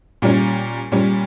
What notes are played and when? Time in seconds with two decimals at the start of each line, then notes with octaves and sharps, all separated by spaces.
0.22 A#2 G3 C#4
0.92 A#2 G3 C#4